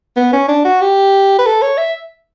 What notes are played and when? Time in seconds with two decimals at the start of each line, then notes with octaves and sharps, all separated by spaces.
0.16 B3
0.33 C#4
0.48 D4
0.65 F#4
0.81 G4
1.39 B4
1.46 A4
1.62 C#5
1.78 E5